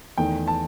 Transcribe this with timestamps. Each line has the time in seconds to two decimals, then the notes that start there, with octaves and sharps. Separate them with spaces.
0.18 E2 D#3 A3 G5
0.48 A5